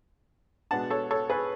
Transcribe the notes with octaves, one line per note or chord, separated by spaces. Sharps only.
B2 G#3 B3 D4 F#5 A5
A4 C#5
A4 C#5
G#4 B4